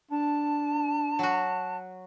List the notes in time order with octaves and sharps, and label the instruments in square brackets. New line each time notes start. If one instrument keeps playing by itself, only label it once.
[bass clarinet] D4 [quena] A5
[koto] F#3 F#4